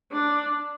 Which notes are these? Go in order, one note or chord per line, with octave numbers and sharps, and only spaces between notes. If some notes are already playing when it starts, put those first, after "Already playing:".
D4